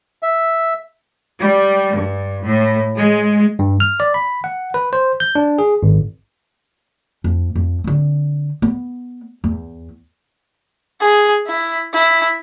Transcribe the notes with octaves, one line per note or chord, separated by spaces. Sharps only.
E5
G3
G2
A2
G#3
G2
F6
D5
B5
F#5
B4
C5
G6
D4
G#4
G#1
F2
F2
D3 C4
B3
E2
G#4
E4
E4